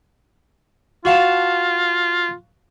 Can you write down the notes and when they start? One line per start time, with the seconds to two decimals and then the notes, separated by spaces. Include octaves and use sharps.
1.05 F4 F#4 F5 A5